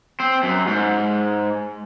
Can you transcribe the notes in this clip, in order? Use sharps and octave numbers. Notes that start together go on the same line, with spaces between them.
C4
F#2
G#2